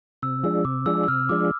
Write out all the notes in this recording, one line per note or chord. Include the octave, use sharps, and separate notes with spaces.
C3 E6
F3 G#3 D4 E6
C3 D6
F3 G#3 D4 E6
E6
C3 F6
F3 G#3 D4 D6